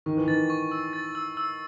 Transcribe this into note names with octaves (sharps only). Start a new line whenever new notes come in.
D#3 C#6
E3
D#3 A6
C#6
E6
A6
E6
E6